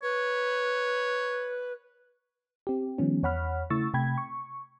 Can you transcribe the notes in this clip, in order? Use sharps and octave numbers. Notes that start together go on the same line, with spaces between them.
B4 C#5
C4 G4
D#3 F3 G3 B3 C#4
E2 C#5 F#5 B5 F6
C#3 A3 E4 C#6 E6 A6
C3 A3 G5 B5 G#6
C#6